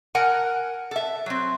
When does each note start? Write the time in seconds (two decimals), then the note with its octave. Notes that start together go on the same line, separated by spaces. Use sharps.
0.15 A#4 F#5 G#5
0.91 A4 E5
1.26 F#3 C4